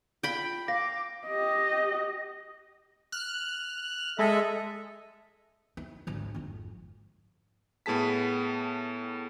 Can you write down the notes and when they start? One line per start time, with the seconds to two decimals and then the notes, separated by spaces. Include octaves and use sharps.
0.23 F4 G5 B5
0.68 F5 D6 A#6
1.27 G4 D#5
3.12 F6 F#6
4.19 G#3 A4 D#5 E5
5.77 E4
6.07 G#1 D2
6.34 G#1 F2
7.86 A2 B3 G#4 A5 B6